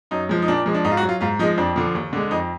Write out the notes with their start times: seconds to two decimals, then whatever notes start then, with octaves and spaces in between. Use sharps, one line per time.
0.11 F#2 D#4
0.29 F3 G#3
0.42 D#4
0.48 A#2 D4
0.66 F3 G#3
0.74 D4
0.84 G#2 D#4
0.92 F4
0.97 F#4
1.03 F#3
1.09 F4
1.21 G#2 F4
1.39 F3 D#4
1.43 G#3
1.58 F2 D4
1.76 D3 F3
1.95 D#2
2.13 D3 G#3
2.31 F2 D#4